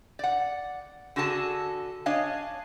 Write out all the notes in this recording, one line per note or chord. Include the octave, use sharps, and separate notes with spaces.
D5 F#5
D3 F#4 G#4 A4 A5
D4 C#5 D#5 F5 G#5